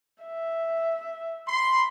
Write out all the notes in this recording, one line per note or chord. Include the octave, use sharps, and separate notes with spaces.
E5
B5 C6